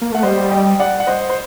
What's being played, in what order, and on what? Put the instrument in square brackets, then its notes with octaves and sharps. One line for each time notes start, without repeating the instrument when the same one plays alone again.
[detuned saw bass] A#3
[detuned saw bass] A3 [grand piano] F#5
[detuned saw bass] G3 [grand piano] C5 D#5
[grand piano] D#5 G5
D5 F#5
F#5
C5 D#5
C5